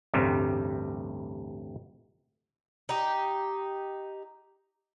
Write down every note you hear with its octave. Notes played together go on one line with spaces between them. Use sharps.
A1 D2 G2 C3 G3
D#4 G4